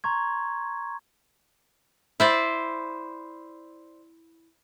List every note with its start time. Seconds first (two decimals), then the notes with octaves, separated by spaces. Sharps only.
0.04 A#5 C6 C#6 G#6
2.20 E4 C5 D5